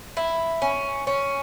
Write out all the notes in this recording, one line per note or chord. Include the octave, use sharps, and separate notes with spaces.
E4
C#4
C#4